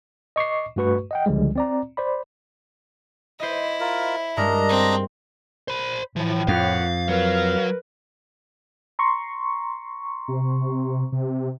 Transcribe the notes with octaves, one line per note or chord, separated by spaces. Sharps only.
D#5 C#6 D6 C7
G2 A3 F#4 B4 C#6
D#5 F#5 G5
C#2 D3 F3 G3 G#3
C4 D5 A#5
C5 D5 B5
E4 C5 D#5
F4 A#4
G2 G#3 D4 A#4 D#5 A#5
C4
C5 B5
A2 E3 F3
F2 A#2 C#5 F5 F#5
F#3 A#4 B4 F5
A#5 C6 C#6
C3
C3